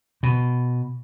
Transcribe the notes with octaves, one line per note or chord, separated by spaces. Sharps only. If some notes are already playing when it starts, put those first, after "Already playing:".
B2